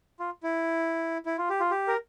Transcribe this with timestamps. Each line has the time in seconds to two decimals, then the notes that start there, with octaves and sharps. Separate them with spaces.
0.20 F4
0.43 E4
1.26 E4
1.38 F4
1.50 G4
1.60 F4
1.71 G4
1.88 A#4